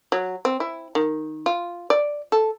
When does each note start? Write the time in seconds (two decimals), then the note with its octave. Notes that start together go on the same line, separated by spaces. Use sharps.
0.12 F#3
0.45 C4
0.60 E4
0.95 D#3
1.46 F4
1.90 D5
2.32 A4